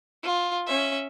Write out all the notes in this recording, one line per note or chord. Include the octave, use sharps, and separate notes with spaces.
F4
C#4 E5